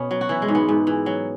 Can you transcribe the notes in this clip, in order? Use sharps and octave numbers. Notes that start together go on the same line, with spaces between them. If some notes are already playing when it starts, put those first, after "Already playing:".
Already playing: B2 B3 C#4
F#3
F#4
E3 E4
G#3
G#2
B3
G#2
E3
F#3